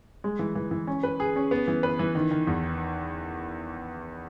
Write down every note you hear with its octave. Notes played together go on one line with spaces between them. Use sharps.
G#3
E3
E3
E3
C#4
B4
G#4
C#4
B3
E3
B4
E3
D#3
D#3
E2